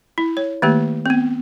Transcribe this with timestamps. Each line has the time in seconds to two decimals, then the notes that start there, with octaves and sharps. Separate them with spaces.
0.18 E4
0.37 C#5
0.62 D#3 A3 A#3 G4
1.06 B3 C4